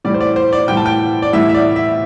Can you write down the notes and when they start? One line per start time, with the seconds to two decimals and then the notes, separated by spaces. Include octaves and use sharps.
0.04 A2 E3 G3 D5
0.14 C5
0.21 D5
0.36 C5
0.53 D5
0.68 A2 E3 G3 G5
0.77 A5
0.86 G5
1.22 D5
1.33 A2 E3 G3 E5
1.49 E5
1.54 D5
1.76 E5